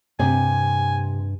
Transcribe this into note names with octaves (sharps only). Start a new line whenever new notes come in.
G2 C3 G#5